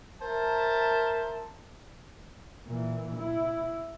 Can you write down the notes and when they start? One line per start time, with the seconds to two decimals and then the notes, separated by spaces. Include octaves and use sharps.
0.22 A#4 C5 E5 A5
2.66 A#2 E3
3.17 E4